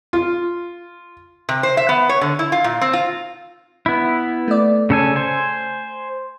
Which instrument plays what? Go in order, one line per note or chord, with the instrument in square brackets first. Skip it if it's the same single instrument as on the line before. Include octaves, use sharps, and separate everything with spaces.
[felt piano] F4
[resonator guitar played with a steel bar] C3
C5
E5
B3
C#5
D3
E4
F4
A#2
C4
F4
[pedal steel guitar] B3 E4
[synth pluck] A3 D5
[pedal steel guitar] C#3 A4 G#5
C5 G#5